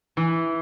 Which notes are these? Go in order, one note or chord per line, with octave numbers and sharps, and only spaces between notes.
E3